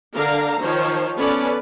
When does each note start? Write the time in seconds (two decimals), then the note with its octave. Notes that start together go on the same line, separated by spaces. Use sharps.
0.15 D3 D4 A#4 F5 A#5
0.61 D#3 F3 C5 C#5
1.17 B3 C#4 A4 B4 D5